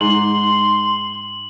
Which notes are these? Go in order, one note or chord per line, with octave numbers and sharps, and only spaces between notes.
G#2 C6 F#7